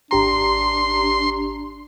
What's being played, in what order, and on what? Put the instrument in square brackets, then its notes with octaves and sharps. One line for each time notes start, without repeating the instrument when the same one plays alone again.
[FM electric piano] G#1 G4 A#5 [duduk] D4 [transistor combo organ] C6